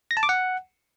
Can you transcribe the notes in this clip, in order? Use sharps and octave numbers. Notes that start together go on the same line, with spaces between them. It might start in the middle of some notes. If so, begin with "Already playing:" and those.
A#6
A5
D6
F#5